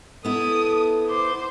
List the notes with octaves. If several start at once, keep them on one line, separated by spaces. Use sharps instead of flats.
B3 E4 A4 D#6
C5 D6